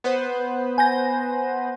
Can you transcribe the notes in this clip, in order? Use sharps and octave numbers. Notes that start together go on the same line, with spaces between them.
B3 B4 C5
G#5 G6 A#6